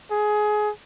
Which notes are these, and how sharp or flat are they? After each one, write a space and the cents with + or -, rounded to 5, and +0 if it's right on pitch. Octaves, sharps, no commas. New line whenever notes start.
G#4 +20